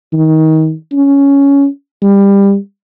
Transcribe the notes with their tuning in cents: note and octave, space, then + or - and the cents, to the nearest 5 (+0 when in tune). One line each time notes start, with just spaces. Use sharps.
D#3 +25
C#4 +10
G3 +20